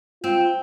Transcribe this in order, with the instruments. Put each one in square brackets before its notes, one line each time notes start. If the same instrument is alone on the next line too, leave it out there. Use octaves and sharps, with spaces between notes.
[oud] C4 [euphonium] F4